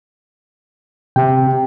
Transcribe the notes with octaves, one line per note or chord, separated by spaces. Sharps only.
C3 G5